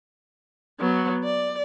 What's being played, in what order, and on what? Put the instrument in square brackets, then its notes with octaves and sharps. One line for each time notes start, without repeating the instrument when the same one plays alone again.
[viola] F#3 B3
D5